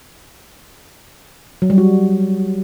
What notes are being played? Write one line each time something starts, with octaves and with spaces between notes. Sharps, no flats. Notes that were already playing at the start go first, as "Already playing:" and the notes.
F#3
G3
F#4